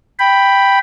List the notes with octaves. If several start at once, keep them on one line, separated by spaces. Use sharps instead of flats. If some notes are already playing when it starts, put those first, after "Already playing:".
G5 B5